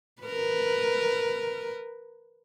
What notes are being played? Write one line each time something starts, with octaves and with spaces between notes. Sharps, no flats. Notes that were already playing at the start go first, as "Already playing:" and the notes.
A#4 B4